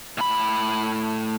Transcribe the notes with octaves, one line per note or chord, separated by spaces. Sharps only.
A2 B5